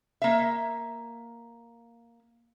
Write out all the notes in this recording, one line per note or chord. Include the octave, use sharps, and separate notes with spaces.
A#3 E5